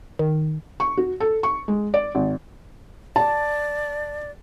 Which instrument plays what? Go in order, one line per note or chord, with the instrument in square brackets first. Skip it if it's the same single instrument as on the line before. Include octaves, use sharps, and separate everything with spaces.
[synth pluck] D#3
[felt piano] C#6
F#4
A4
C#6
G#3
D5
G#1
[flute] D5 [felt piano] A5